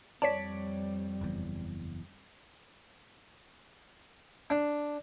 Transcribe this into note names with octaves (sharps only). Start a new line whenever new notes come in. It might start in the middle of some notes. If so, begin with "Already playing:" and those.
F2 G3 C#5 D5 A5 B6
F#1 E2
D4